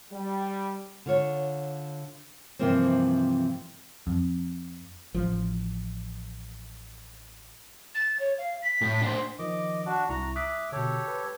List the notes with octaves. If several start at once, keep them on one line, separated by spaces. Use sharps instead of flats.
G3
D3 F4 C#5
G2 C3 E3 F3 A#3 C4
F2
A1 F3
A6
C#5
F5
B6
A2
D4 C5
D#3 F3 D#5 D6
D4 F#4
C2 E4 A#5 C#6
E5 D6 D#6 F#6 B6
B2 D3 G4 A4 C#5
B4